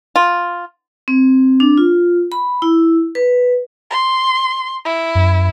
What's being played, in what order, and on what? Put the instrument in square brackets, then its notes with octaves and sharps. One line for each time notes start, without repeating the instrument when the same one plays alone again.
[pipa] F4
[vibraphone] C4
D4
F4
B5
E4
B4
[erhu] C6
E4
[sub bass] F#2